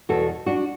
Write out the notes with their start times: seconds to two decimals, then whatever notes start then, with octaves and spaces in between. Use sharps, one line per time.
0.09 E2 B2 F#4 A4
0.46 D4 F#4